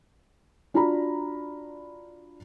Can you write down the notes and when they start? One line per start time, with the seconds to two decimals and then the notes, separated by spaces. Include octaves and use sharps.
0.74 D4 F4 F#4 D5 A#5 B5